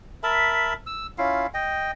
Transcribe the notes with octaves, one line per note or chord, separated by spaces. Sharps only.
A#4 E5 A5 B5
E6
C#4 E4 F4 F5
D#5 G5